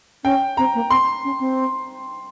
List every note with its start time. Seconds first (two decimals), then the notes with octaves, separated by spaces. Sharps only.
0.24 C#4 G5
0.57 C4 A#5
0.74 A#3
0.90 C4 C6
1.24 C#4
1.40 C4